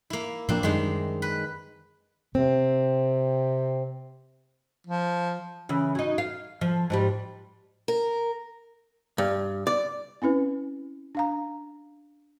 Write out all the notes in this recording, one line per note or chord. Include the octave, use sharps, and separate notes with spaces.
A#3 E4
A2 F3 A#3 C4 D4
F#2 D#3 G3 G#3 C4
B4
C3 C4
F3
C#3 E3
F#3 D#4
F5
F3
G#2 F3 G3
A#4
G2
D5
C4 C#4 E4 B4
D4 F5 A#5